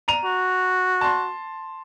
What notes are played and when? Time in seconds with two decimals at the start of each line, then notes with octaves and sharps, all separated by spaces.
0.08 A#5 D#7 F7
0.25 F#4
1.01 A5 C6